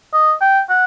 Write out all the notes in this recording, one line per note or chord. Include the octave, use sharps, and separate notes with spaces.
D#5
G5
F#5